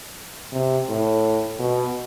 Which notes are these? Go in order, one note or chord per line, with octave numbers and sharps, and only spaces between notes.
C3
A2
B2